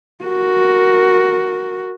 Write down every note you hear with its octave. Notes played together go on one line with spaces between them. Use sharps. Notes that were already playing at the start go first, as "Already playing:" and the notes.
F#4 A#4